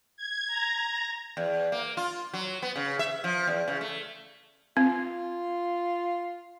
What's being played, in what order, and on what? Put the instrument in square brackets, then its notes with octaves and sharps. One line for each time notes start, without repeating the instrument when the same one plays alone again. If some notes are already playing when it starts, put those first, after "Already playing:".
[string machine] G#6
A#5
[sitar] E2
A#3
F4
F#3
B3
C#3
E5
F3
E2
C#3
A3
[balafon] C4 [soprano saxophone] F4